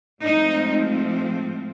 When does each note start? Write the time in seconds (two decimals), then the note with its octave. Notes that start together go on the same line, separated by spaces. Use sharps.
0.23 A2 F3 G#3 C4 D#4